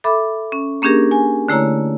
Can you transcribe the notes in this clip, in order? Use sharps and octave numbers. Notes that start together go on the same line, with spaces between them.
A4 E5 B5 D6
C#4
A#3 C#4 D4 G4 G#4 A#4
G#5
D3 A3 E4 C#5 A#5